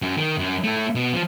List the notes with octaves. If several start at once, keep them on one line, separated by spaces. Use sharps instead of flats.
F#2
D#3
F#2
A3 E4
B2
F3